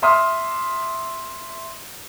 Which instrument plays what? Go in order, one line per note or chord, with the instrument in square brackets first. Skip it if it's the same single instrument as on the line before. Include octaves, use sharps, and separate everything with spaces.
[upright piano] E5 C6 D#6 F6